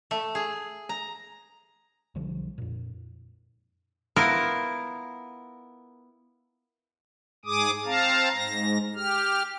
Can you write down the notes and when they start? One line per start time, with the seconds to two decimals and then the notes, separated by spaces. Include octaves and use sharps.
0.11 A3
0.35 G#4
0.89 A#5
2.15 B1 D3 F3 G3
2.58 F2 A#2
4.16 B3 E4 F4 A#4
7.45 G#2 G#4 D6 D#6
7.85 C4 F5 A5 A#5
8.35 G#2 A#6
8.95 G4 F6